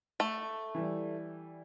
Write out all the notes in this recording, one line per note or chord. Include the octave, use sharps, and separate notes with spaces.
A3
E3 G3